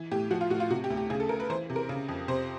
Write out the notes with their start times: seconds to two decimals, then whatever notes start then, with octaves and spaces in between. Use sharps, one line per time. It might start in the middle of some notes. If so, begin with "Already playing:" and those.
Already playing: E3
0.11 A2 G4
0.31 F3 F#4
0.41 F4
0.50 A2 F#4
0.60 F4
0.70 C3 F#4
0.84 G4
0.90 D2
0.97 G4
1.10 C#3 G#4
1.20 A4
1.29 D2 A#4
1.40 B4
1.50 E3 C5
1.70 C3
1.76 A#4
1.89 C#3
2.09 F2
2.28 C3 C5